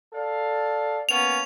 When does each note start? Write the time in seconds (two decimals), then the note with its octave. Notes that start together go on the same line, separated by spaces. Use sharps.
0.12 A4 D5 F5
1.09 A#3 B3 C#4 F7